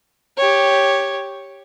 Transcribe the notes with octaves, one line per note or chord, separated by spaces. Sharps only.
G4 C#5